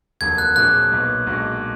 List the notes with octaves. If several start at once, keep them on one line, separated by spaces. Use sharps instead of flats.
F1 D#2 D3 F#3 A#3 G#6
F#6
A#1 A#2 F#3 D4 G#4 F#6
B1 A#2 F#3 B3
B1 A#2 G#3 D4 F#4